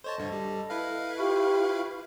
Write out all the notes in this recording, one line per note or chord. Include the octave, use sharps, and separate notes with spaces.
A4 C5 C#5 D#5 A5
D2 G2 D3
G3
E4 B4 F5
F4 G4 C#6